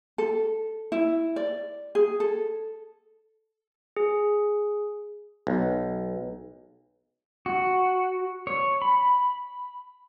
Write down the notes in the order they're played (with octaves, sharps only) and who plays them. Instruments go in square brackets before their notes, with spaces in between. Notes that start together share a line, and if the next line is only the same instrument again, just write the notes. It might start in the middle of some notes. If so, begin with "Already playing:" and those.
[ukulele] A4
E4
D5
G#4
A4
[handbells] G#4
[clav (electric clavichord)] B1
[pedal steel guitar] F#4
C#5
B5